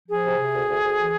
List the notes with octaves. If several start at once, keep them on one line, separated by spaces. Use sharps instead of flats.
F3 G#4
C3
C3
D2
D2
D2
E3